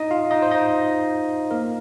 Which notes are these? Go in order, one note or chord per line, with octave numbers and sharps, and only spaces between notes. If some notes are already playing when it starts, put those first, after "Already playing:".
Already playing: D#4 D#5
F4 F5
D#4 D#5
C5
D#4 D#5
A#3 A#4